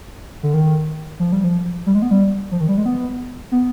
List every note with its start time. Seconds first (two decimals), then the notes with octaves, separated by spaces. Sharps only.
0.43 D3
0.54 D#3
1.20 F3
1.32 G3
1.44 F3
1.86 G3
1.95 G#3
2.02 B3
2.11 G3
2.52 F3
2.60 D#3
2.69 G3
2.77 G#3
2.86 B3
3.52 B3